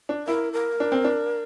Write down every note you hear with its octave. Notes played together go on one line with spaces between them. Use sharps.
D4
E4 A#4
A#4
D4
C4
D4